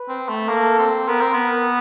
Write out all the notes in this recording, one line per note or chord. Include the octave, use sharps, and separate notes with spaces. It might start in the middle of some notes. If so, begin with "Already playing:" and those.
Already playing: B4
C4
A3
A#3 A4
C4
B3 A#4
C4
B3